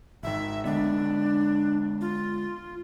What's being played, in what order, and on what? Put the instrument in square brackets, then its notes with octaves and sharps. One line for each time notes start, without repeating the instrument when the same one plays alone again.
[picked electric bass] G#1 D#3 [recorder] E5
[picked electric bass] D3 G#3 B3 [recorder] D4
[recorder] F4